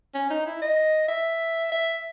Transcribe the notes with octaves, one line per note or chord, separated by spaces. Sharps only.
C#4
D#4
E4
D#5
E5
E5